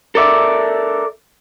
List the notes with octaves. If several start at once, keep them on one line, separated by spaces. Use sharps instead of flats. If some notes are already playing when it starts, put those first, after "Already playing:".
A4 A#4 D5 E5